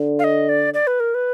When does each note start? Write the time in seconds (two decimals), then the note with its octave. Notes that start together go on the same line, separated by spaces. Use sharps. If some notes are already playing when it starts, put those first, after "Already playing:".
Already playing: D3
0.19 F5
0.24 D#5
0.49 D5
0.74 D5
0.87 B4
1.00 A#4
1.14 B4